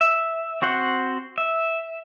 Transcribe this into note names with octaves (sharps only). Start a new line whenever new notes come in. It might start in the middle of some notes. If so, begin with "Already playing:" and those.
E5
C4 F#4 C5 F#5
E5